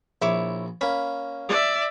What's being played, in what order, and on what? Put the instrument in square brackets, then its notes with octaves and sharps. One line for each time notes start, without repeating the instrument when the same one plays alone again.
[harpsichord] A#1 [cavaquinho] E4 C#5 D6
[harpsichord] A#3 C#4 [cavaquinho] B5
[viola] D5 E5